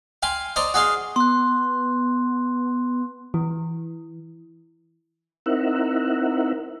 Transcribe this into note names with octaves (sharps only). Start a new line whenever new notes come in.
F5 G5 G#5 B5 C6
C5 D5 D#5 A#5 C6 C#6
F#4 G#4 D#5 F5 C6
B3 C6 F#6
E3
C4 D#4 E4 A#4 E5 F#5